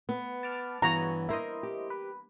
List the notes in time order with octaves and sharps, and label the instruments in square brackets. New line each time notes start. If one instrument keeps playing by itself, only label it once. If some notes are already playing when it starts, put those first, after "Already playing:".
[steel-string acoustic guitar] B3
[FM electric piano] A5 D6 F6
[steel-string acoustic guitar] G2 [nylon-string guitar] E3 B3 [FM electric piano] F#4 G#4 C#5 [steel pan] A#5
[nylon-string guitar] A#3 A#4 [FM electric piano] E4 C5 D#5
[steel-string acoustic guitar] G4
[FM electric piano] B4